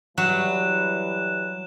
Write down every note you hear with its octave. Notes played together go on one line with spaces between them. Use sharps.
E3 F#3 G3 F#6 E7